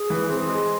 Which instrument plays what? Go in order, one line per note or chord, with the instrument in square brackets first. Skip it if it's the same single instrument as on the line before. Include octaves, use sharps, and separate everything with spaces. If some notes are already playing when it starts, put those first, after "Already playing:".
Already playing: [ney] G#4
[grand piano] E3
C4
G#3